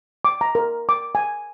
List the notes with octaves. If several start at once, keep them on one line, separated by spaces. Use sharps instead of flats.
D6
A#5
A#4
D6
G#5